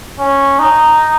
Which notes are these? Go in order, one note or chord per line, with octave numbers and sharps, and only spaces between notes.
C#4
D#4